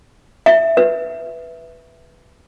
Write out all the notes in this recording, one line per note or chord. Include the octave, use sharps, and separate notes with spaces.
E5
B4